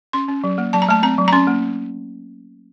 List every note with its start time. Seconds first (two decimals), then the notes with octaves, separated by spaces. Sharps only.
0.13 C#4 C6
0.28 C#4
0.44 F#3
0.58 A#3
0.73 F#3 A5
0.82 A#5
0.89 A3 A5
1.03 C4 A#5
1.18 F#3
1.28 A#5
1.33 C#4 C6
1.47 A#3